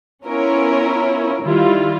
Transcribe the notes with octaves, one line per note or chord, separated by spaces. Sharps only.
B3 C#4 E4 F4 A#4 C#5
D#3 G3 E4 F4